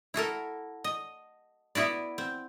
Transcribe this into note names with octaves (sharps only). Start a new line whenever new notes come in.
E4 F#4 A4 A#4
D#5
B3 E4 F#4 D5
C4